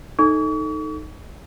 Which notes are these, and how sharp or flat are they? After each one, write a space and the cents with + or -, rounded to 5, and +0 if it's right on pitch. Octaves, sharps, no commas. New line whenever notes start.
D#4 +0 A4 +0 C#6 +40